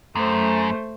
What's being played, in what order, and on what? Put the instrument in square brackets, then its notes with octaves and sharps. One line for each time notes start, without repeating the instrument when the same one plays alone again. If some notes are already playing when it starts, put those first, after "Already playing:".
[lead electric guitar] F#2 [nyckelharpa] A3 C5